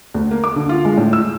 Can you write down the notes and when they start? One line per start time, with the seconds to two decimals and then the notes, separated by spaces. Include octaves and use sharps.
0.15 D2
0.31 A#3
0.44 D6
0.56 D3
0.69 F4
0.85 G#3
0.97 A2
1.13 E6